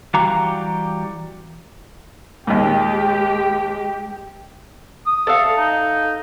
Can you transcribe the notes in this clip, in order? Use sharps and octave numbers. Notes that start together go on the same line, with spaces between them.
E3 G3 F#4 G4 F5 A#5
D#2 A#2 G#3 G4
D#6
A4 E5 F5
D#4